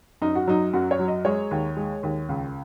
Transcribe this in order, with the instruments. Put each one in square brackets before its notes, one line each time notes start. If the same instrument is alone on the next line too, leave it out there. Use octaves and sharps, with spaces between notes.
[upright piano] F#2 D#4
F#4
F#3 D#4
F#2 F#4
C#5
F#3
D#5
G#3 C#5
D#2
G#3
D#2
C#2